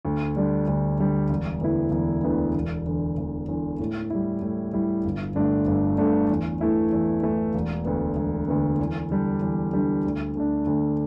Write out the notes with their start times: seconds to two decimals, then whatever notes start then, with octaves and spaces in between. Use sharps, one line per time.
0.05 D2
0.36 D3 G3 D4
0.67 D2
0.99 D3 G3 D4
1.30 E1
1.61 D2 D3 B3 E4
1.92 E1
2.23 D2 D3 B3 E4
2.55 E1
2.86 E2 D3
3.18 E1
3.48 E2 D3
3.79 A2
4.10 G3 E4
4.42 A2
4.73 G3 E4
5.05 G1
5.35 G2 D3 A3 D4
5.67 G1
5.98 G2 D3 A3 D4
6.29 E2
6.61 E3 A3 E4
6.92 E2
7.23 E3 A3 E4
7.54 E1
7.85 D2 D3 B3
8.17 E1
8.48 D2 D3 B3
8.79 E2
9.10 D3 G3 D4
9.41 E2
9.73 D3 G3 D4
10.05 D2
10.35 D3 A3 D4
10.67 D2